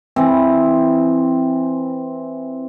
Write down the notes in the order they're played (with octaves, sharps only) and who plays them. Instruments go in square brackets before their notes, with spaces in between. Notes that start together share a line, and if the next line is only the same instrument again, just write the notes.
[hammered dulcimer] E3 C4